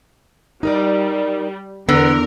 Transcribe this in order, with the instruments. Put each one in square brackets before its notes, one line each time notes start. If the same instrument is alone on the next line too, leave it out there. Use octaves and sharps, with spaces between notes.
[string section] G3 [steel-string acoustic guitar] D#4 A#4 D5
[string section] E2 A#4 [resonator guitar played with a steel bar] D3 [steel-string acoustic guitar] B3